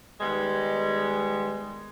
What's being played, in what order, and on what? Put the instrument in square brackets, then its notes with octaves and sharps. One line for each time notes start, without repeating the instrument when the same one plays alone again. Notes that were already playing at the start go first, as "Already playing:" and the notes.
[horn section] D#3 G3 G#3 B3